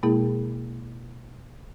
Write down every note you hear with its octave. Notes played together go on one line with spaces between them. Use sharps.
B2 G#3 A#3 E4 G#4